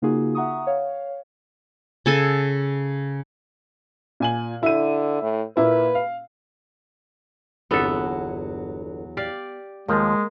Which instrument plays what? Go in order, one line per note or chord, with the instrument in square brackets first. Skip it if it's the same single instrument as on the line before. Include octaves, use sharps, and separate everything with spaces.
[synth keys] C#3 A#3 D#4 F4 F#4 G#4
E5 F#5 A#5 C#6 D#6
C#5 F5
[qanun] C#3 A4 G#5
[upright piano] A#2 G#5 F#7
[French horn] D3 [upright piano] E4 D#7
[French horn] A2
[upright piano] A#2 A#3 E4 [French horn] B4
[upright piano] F5
[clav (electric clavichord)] G1 A4 [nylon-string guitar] E2 F#3 C4 [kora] B3 E5
[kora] G4 D5 F5
[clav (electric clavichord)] D#2 F3 [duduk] G#3 [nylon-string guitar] A#3